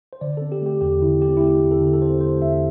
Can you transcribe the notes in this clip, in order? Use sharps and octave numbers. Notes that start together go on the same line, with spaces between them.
C5
D3 D5
C4 A4
G4
A3 G4
E2 G4
D3 E4
C4 G4
E4
A3 G4
E2 G4
A4
D3
A4
C4 C5
A3 C5
E2 E5